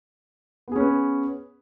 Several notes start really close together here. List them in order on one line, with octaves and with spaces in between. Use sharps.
B3 G#4 C#4 B4